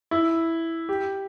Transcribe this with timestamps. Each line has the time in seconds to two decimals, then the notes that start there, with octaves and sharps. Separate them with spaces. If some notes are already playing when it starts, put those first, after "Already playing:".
0.11 E4
0.89 G4